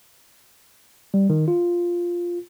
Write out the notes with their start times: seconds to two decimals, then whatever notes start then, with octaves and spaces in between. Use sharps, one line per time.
1.14 G3
1.30 D#3
1.48 F4